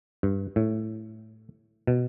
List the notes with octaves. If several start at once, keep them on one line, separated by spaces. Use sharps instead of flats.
G2
A2
B2